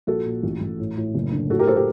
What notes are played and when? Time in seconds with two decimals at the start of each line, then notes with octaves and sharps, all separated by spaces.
0.07 A#1 F#4 A4
0.26 A#2
0.43 A1
0.61 A1
0.79 A2
0.97 A2
1.14 F#1
1.32 D3
1.50 A2 F#4 A4
1.59 G4 A#4
1.67 A4 C5
1.76 G4 A#4